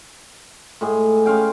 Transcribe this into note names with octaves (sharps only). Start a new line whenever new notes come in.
A2 G#3 G#4
G#3 C#4 F5 G5